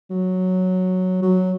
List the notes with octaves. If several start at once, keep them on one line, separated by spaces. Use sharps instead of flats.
F#3
F#3